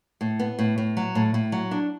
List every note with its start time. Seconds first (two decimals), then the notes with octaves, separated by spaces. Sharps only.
0.21 A2
0.39 B3
0.59 A2
0.78 A2
0.97 F#3
1.15 A2
1.34 A2
1.52 F#3
1.71 D4